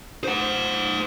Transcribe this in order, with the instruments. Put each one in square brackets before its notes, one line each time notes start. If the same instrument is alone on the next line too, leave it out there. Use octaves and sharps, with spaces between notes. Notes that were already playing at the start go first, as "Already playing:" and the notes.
[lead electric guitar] C5 F#5